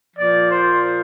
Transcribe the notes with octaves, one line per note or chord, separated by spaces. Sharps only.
A#2 F3 D5
C5